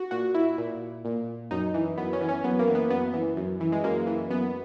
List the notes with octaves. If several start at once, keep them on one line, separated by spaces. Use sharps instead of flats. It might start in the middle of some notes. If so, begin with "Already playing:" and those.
Already playing: F#4
A#2 F#4
E4
A#2
A#2
F#2 D#4
E3
F#2 B3
C#4
E3
C#4
F#2 B3
A#3
E3
B3
F#2 B3
E3
F#2
E3
G#3
F#2 A#3
E3
F#2 B3